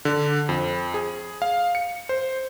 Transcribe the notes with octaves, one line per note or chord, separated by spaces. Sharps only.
D3
F2
G#4
F5
C#7
C5